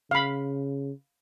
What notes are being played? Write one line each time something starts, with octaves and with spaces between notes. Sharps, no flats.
C#3 F5 B5